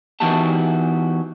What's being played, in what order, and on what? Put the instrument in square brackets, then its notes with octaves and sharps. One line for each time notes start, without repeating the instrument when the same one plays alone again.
[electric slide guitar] E3 B3 D#4 F#4 G4 A5